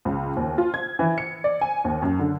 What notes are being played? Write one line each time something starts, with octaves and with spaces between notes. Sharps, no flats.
C#2
D#2
F4
G#6
E3
C#7
D5
G#5
D#2
F#2
D3